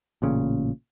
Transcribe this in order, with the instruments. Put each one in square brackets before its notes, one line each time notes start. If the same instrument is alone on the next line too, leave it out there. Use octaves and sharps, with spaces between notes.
[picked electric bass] A1 A#2 C#3